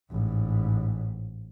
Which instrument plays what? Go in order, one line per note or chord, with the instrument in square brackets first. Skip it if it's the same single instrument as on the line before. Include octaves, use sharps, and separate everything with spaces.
[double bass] A1 G#2